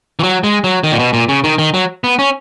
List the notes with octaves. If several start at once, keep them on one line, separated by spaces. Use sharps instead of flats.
E3
F#3
G#3
F#3
D#3
A#2
B2
A#2
C#3
D#3
D#3
F#3
B3
C#4